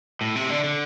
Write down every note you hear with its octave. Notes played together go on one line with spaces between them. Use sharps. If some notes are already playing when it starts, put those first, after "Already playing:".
A2
C3
D3
D3